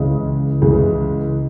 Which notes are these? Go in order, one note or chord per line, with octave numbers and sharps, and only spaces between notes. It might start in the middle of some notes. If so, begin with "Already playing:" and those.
Already playing: C#2 C#3 E3 G#3
C#2 C#3 E3 G#3